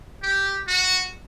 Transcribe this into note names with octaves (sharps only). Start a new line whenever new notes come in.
G4
F#4